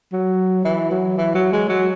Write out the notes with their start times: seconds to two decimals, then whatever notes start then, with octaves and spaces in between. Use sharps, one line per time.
0.13 F#3
0.65 E3
0.91 F#3
1.17 E3
1.35 F#3
1.53 G#3
1.69 F#3